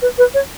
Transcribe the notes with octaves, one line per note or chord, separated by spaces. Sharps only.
B4
B4
C#5